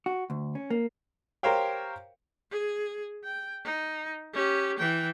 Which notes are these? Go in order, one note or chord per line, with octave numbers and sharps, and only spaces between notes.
F#4
D2
C#4
A#3
G4 A#4 C5 C#5 F5 G5
G#4
G5
D#4
C#4 G4
E3 G5